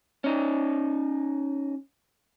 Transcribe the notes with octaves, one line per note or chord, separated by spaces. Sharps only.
C#4 D#4